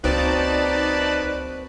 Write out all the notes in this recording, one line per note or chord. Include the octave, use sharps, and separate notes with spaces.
C#2 F#3 A#3 C4 D#4 B4 D5 A5